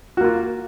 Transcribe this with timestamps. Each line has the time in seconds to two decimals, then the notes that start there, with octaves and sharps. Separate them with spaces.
0.17 F#4
0.21 A#3
0.24 F4